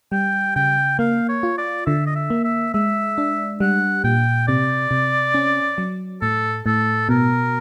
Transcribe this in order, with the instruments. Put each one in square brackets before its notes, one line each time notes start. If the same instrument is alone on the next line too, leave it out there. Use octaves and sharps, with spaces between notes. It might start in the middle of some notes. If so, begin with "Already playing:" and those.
[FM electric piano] G3 [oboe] G5
[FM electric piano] C#3 [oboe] G5
[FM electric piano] A#3 [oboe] F5
[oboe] C#5
[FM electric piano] F4
[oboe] D5
[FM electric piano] D3 [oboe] E5
[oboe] D#5
E5
[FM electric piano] A#3
[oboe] E5
[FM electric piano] G#3 [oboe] E5
[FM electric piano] D4
[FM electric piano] G3 [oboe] F#5
[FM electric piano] A#2 [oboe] G5
[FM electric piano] C3 [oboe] D5
[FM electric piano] C3
C#4
F#3
[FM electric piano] A2 [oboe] A4
[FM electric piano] A2 [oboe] A4
[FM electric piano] B2 [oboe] A#4